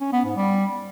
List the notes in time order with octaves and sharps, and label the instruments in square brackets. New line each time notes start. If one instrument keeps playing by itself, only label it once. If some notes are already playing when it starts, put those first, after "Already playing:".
[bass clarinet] C#4
B3
G#2
G3